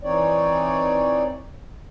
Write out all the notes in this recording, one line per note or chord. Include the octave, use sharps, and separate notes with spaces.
E3 C4 D#4 C#5 D5